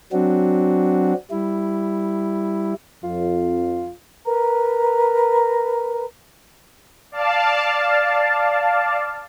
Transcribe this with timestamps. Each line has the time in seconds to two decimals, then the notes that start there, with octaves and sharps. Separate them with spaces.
0.12 F#3 C4 D4 F#4
1.31 G3 E4
3.04 F2 F4
4.25 A#4 B4 A#5
7.12 D5 F5 A5